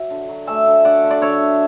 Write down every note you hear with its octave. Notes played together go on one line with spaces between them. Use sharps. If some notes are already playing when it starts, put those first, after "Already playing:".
Already playing: F#3 E5
D3
F#3
A3 E5 G#5
D3
D3 D5 F#5
D3
D5
D3 C#5 E5
D3